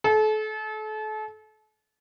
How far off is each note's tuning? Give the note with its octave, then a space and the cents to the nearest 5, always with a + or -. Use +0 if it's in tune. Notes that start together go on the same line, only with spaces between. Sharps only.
A4 -35